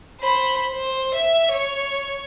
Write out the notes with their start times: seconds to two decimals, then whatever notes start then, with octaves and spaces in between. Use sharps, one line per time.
0.20 C5 B5
0.75 C5
1.15 E5
1.51 C#5